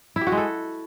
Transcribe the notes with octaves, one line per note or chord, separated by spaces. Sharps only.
E4
G4
F#4
G#3
A4